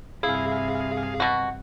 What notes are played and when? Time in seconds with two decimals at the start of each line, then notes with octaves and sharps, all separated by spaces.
0.23 G2 C3 E4 G#4 F5
1.20 B2 F#4